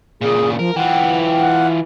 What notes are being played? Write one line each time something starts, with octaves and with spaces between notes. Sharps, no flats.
A#2 C#3 G#4
F3 A#4
E3 F4 F#5 G5
F#5